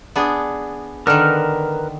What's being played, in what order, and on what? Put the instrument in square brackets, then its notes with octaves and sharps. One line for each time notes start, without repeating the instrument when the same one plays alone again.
[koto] B3 D4 G#4
[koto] D3 D#3 [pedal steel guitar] A#4 B4 F6